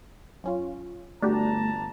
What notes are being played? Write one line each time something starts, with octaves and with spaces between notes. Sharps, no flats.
F#2 C#4 F4
G1 A3 D4 F#4 G4 A5 A#5